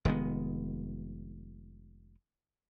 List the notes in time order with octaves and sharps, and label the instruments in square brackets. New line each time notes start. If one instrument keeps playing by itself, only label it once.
[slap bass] F1 D#3 G#3 B3